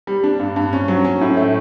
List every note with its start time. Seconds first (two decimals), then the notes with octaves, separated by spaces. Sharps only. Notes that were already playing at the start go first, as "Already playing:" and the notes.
0.07 G3
0.24 D4
0.40 G2
0.56 G2
0.73 C#4
0.88 F#3
1.04 C#4
1.21 A2
1.37 A3